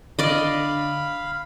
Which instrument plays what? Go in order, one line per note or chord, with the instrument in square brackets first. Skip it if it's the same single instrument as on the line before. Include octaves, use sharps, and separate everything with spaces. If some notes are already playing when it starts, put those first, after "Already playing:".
[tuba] D3 [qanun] D5 D#5 [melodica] F5 B5